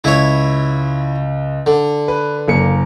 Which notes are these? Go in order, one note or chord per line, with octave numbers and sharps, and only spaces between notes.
C#2 E4 C#5
D3
B4
F#1 A#3 C#7